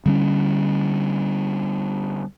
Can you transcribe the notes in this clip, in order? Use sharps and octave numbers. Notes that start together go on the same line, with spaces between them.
D3 G3 A3 C#4